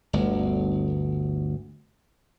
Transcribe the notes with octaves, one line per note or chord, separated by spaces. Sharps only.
G1 D2